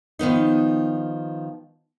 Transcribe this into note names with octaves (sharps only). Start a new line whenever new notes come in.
D#3 F3 B3 D#4